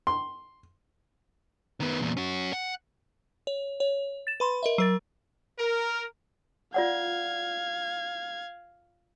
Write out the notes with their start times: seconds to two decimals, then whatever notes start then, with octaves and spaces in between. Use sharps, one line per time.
0.07 C6
1.80 D#3 B3
2.02 E2 A#2
2.17 C#4 F#4
2.53 F#5
3.47 C#5
3.80 C#5
4.27 A6 E7
4.40 B4 B5 C6
4.63 A#4 D#5 E5
4.78 F#3 A#4 A6
5.59 A#4
6.74 F4 D5 F5 F#5 G#6